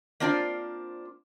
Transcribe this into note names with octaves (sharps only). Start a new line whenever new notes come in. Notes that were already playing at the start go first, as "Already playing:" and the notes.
A#3 C4 D4 F4 C5 D5